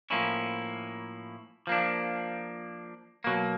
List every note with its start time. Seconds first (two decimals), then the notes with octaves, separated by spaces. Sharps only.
0.10 A2 F3 A#3 C#4 E4
1.67 F3 A#3 D4
3.24 B2 F#3 A#3